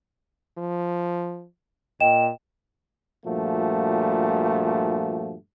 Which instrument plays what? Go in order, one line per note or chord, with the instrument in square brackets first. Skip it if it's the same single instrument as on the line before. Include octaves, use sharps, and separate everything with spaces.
[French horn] F3
[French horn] A#2 [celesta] D#5 G5 E7
[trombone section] G2 A#2 F3 A3 F#4